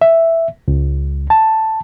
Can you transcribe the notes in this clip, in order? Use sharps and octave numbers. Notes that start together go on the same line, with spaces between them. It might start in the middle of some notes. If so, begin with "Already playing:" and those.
E5
C#2
A5